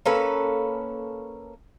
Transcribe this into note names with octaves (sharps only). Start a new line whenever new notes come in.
A#3 C#4 A4 B4